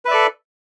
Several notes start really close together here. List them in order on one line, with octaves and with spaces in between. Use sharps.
B4 E5 D5 A4